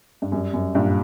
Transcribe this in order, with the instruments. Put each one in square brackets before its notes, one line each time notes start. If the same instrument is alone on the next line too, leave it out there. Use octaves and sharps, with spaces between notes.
[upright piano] G2
[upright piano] F#2 [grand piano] G3
[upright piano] F#2
[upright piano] G2 [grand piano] A#2